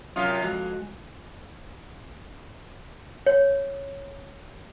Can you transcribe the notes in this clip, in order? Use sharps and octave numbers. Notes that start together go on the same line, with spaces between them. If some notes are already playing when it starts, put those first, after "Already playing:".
F#2 C3 F4 D#6
F2 G#3 F#4
C#5